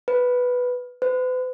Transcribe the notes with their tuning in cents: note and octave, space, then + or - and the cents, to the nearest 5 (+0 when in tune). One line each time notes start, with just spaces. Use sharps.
B4 +0
B4 +45